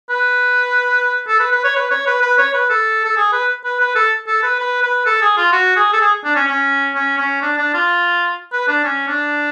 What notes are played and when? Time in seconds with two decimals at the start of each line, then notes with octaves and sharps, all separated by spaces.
0.10 B4
1.28 A4
1.40 B4
1.52 B4
1.64 C#5
1.76 B4
1.91 C#5
2.07 B4
2.22 B4
2.38 C#5
2.54 B4
2.70 A4
3.05 A4
3.17 G#4
3.33 B4
3.64 B4
3.80 B4
3.95 A4
4.28 A4
4.43 B4
4.59 B4
4.83 B4
5.06 A4
5.22 G#4
5.37 F4
5.53 F#4
5.77 G#4
5.93 A4
6.00 G#4
6.25 D4
6.35 C#4
6.48 C#4
6.95 C#4
7.18 C#4
7.42 D4
7.58 D4
7.74 F4
8.53 B4
8.68 D4
8.84 C#4
9.08 D4